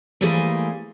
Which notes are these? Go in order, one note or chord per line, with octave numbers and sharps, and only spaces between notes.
E3 G3 A3 A#3 G#4 C5